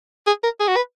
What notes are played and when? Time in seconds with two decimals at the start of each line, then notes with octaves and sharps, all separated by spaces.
0.27 G#4
0.43 A#4
0.60 G#4
0.68 F#4
0.76 B4